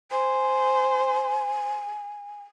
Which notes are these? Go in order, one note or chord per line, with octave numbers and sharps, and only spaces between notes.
C5 G#5